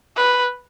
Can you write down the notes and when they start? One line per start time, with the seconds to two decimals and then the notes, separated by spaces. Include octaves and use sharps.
0.16 B4